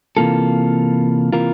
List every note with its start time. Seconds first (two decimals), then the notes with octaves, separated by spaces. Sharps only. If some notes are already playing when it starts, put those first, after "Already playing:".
0.17 C3 E3 A#3 F4 A4
1.33 C3 E3 A#3 F4 A#4